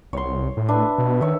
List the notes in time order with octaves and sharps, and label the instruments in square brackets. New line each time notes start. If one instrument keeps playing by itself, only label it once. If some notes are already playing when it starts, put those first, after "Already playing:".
[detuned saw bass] C2 [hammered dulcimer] C#5 C6
[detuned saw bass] A2
[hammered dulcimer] D4 B4 E5
[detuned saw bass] B2
[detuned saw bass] D#3 [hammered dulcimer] C#5 E5